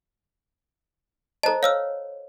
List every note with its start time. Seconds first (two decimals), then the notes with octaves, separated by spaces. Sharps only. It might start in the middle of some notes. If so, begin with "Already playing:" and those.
1.43 A4 C5 D#5 A5 A#5
1.63 C#5 F5 E6 F6